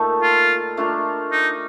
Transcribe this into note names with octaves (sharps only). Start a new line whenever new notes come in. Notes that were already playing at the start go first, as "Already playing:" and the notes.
Already playing: A#2 A3 D#4 A4
F4
A3 D4 F4 A#4
D#4